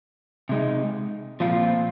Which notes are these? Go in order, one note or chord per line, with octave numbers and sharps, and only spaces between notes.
C3 G#3 D#4
A#2 F3 C4 F4